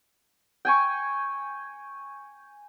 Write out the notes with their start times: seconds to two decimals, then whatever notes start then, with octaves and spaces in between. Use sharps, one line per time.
0.65 G5 G#5 C#6